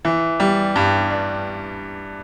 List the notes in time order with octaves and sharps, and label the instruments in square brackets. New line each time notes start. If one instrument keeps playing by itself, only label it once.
[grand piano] E3
G3
G2
D4